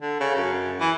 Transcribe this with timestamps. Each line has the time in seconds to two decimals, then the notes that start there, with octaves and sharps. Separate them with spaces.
0.02 D3
0.20 C#3
0.36 F#2
0.80 E3